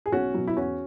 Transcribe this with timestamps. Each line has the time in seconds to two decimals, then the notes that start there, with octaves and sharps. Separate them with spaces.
0.06 G#4
0.12 B1 C#4 F#4
0.34 B2 F#3
0.47 E4
0.57 E2 C#4 F#4